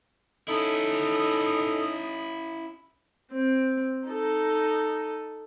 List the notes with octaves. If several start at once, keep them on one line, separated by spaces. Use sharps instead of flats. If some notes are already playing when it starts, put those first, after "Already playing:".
C#4 D#4 E4 A4 D#6
C4
D#4 A4